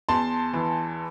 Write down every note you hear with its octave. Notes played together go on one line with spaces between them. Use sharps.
E2 A5 C6
E3